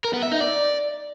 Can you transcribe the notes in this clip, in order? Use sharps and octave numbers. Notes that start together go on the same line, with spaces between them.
A#4
B3
E5
D#4
D5